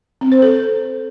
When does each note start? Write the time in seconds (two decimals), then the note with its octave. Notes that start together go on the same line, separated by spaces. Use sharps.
0.21 C4
0.32 C5
0.42 A4